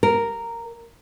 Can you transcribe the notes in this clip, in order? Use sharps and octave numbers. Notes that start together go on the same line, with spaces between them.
A#4